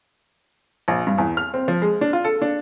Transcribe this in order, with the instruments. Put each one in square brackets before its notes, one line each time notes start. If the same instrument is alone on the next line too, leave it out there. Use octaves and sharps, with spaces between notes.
[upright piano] A#1
G2
E2
F6
C4
F3
G#3
D4
F4
A4
D4